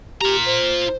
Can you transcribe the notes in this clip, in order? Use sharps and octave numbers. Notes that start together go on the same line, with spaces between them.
F4 G4 A#5
C5